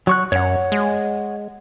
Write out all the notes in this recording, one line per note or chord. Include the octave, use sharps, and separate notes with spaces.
F#3 C#6 F#6
F#2 C#5 F#5
G#3